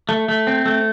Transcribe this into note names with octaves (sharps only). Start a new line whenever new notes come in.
A3
A3
C4
A3